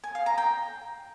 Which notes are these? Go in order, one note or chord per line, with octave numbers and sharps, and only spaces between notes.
G#5
F5
A#5
G5